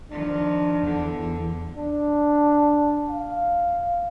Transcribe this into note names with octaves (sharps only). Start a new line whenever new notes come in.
D#3 F3 D4
E2 D3
D4
F5